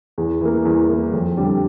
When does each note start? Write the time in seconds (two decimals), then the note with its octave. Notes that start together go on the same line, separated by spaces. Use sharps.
0.18 E2
0.41 E3 A#3
0.65 E2
0.89 E3 A#3
1.13 F2
1.37 D3 G3